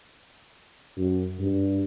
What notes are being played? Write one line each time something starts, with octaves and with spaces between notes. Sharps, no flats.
F#2
G2